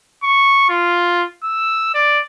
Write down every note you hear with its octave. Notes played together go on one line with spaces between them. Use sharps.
C#6
F4
E6
D5